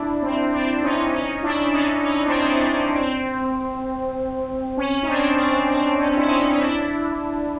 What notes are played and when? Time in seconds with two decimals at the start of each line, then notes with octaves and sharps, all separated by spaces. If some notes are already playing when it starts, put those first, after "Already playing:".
Already playing: D4 E4
0.22 C4
0.53 C4 D4
0.83 C#4 D#4
1.13 C#4 D#4
1.43 D4 E4
1.68 E4
1.73 C#4 D#4
2.04 C#4 D#4
2.27 C4 D4
2.44 C#4
2.49 C4
2.65 C4
2.72 C#4
2.95 C4
4.77 C#4
5.03 D#4
5.08 C4 D4
5.38 C4
5.68 C4
5.98 C#4
6.17 E4
6.28 C#4 D#4
6.53 D#4
6.59 D4 E4